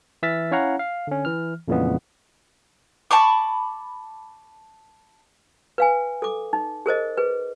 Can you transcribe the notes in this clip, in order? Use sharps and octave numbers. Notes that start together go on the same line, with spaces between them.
E3 E5 E6 F6 A6 B6
C#4 E4 C#5 F5 F#5 A#5
F5
D3 C#4
E3 F6
F2 A#2 C#3 E3 G#3 B3
A5 B5 C#6 D6
B4 F5 G#5
A4 D6
D#4
G#4 A#4 C5 D#5
G#4 B4